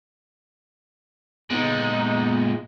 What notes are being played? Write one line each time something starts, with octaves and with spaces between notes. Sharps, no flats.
A#2 G#3 B3 D#4